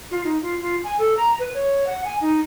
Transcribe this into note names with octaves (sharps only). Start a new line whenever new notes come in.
F4
D#4
F4
F4
G#5
A4
A#5
B4
C#5
F#5
G#5
D#4